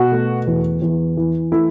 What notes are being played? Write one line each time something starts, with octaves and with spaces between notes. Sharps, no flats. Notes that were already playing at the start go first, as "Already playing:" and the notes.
Already playing: B2 F#4
A3
E2
E2
E3
A3 E4